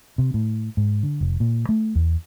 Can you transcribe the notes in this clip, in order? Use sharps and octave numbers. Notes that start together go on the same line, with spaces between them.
C3
A2
G#2
D3
F1
A#2
A3
E2